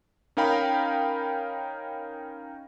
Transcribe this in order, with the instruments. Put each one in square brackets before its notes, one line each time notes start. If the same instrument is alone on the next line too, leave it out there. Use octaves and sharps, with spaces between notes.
[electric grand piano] C#4 D#4 A#4 F5 G5 B5